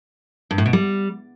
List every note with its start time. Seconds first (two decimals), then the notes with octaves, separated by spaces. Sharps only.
0.51 G2
0.58 A2
0.66 B2
0.73 G3